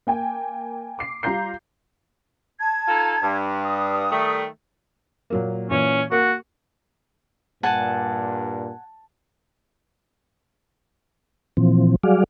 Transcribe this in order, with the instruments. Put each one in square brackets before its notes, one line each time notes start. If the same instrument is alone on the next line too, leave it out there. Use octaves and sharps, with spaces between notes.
[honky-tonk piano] A#3 G5 G#5
D6 C7
G3 F4 F5 A#5 G6 C7
[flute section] A5 G#6
[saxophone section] D#4 F4 A4
G2
[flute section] D#6
[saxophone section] D#3 G3 A3
[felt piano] A#2 F#3 A#3
[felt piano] A#2 E3 [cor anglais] C#4
[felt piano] A#3 [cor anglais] F#4
[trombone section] G2 A#2 [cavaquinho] F#5 G#5 [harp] A5
[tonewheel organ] A#2 E3 F3 C4
F#3 G3 F#4 G#4 D5 F5